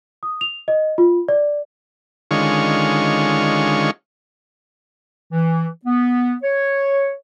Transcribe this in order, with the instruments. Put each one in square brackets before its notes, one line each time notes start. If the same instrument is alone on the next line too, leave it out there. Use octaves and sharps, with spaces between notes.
[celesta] D#6
F7
D#5
F4
D5
[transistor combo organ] D3 D#3 G#3 C#4 F4 C#6
[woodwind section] E3
B3
C#5